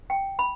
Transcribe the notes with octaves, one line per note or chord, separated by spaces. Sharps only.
G5
B5